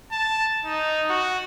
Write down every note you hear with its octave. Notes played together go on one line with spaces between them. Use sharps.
A5
D#4
F#4